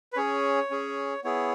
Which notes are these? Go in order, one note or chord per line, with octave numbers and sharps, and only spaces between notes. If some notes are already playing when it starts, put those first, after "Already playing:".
B4
C#4 G#4 C#5
C#4 G#4
B3 E4 G#4 C#5